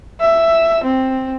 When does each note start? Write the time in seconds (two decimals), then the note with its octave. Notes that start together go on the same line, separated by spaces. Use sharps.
0.21 E5
0.84 C4